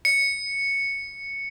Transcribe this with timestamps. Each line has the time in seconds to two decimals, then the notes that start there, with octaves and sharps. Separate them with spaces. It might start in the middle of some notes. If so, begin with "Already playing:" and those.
0.05 C#7